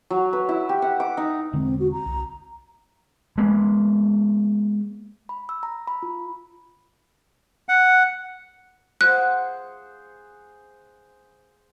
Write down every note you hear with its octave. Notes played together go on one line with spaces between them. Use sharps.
F#3
B4
E4
G4
F#5
D6
D#4
E1 D3 G#3 C4
F#4
A#5
C2
G#3 A#3 B3
B5
E6
A#5
B5
F4
F#5
G#4 C5 F#5 F#6